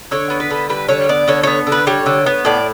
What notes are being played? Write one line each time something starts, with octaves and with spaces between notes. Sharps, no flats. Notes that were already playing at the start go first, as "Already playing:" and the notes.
D3 C#5
B3
B4
D3
G3 B4
D3 C#5
B3 D5
D3 C#5
B3 C#5
D3
B4
G3 C#5
D3
B3
A2 D5